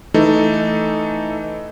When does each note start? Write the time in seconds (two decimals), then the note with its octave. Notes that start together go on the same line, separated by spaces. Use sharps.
0.14 E3 A3 D#4 A4